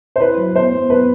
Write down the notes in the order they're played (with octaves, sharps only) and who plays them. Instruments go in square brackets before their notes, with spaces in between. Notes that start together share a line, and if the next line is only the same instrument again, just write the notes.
[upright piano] C5
[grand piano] E4 [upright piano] B4
[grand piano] F#3
[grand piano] B3 [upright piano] C5
[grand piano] B3
[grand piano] B3 [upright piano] B4